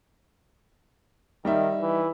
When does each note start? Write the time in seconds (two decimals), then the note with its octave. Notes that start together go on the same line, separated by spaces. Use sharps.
1.45 D#3 G3 D#4 E5
1.81 E3